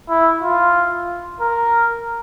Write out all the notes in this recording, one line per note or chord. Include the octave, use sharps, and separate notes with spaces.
E4
F4
A#4